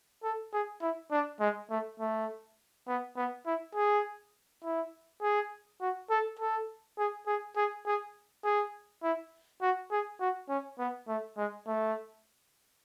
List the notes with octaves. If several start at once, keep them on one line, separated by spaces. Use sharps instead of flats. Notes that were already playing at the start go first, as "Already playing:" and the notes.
A4
G#4
E4
D4
G#3
A3
A3
B3
B3
E4
G#4
E4
G#4
F#4
A4
A4
G#4
G#4
G#4
G#4
G#4
E4
F#4
G#4
F#4
C#4
B3
A3
G#3
A3